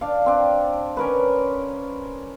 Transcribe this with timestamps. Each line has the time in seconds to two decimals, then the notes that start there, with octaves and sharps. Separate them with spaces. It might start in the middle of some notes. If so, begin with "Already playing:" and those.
0.01 D4 F5
0.26 C4 D4
0.97 C#4 A#4 B4